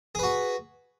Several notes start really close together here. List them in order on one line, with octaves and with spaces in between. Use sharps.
G#4 B4 F#4